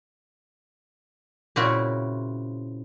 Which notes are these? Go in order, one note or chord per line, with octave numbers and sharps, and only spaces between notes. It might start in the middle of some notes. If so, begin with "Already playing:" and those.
A#2 C#3 C4 E4 F#4